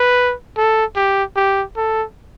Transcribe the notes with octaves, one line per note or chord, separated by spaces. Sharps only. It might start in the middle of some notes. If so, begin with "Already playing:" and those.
Already playing: B4
A4
G4
G4
A4